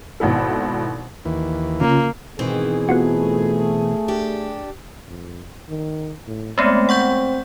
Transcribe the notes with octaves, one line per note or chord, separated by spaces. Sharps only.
G#1 B2 E4 A4
D#2 E3
C#3 A#3 C#4 F4
G#2 B2 D#3 E3 C4 G#4
A3 B3 F4 F#4
D4 G4
F2
D#3
A2
G#3 A3 B3 C4
F#5 C#6 G6